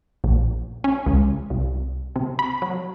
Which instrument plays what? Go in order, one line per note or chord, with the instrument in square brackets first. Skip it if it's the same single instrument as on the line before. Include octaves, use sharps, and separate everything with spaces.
[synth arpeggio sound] A#1
C#4
C#2
C2
C3
B5
F#3